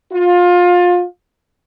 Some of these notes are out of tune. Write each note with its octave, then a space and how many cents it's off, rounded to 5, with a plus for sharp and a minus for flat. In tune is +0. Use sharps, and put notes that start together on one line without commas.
F4 +25